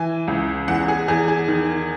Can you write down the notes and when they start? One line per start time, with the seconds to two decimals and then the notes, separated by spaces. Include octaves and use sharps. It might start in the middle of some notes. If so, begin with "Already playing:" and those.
Already playing: E3 G#5
0.28 C#2
0.68 E2 F#5
0.88 G#4
1.08 E2 G#4
1.28 G#4
1.48 D#3